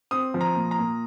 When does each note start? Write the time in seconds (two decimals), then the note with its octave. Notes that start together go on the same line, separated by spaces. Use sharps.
0.11 C4 D#6
0.34 F3
0.41 A#5
0.55 A#2
0.71 A#5
0.78 A#2